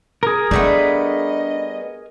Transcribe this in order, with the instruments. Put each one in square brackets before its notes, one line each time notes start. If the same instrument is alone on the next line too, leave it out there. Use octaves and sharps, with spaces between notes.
[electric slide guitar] G#4 A#4
[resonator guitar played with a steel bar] G3 A3 B3 [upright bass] D4 [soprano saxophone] D#5